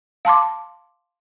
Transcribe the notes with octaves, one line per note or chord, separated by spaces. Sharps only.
F5 A5 C6 D6